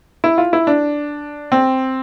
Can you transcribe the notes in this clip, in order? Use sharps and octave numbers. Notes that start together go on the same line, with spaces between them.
E4
F4
E4
D4
C4